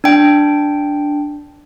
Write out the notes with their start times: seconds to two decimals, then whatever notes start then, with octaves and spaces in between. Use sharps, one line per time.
0.04 D4 G5